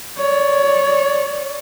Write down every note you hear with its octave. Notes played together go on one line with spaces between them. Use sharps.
C#5 D5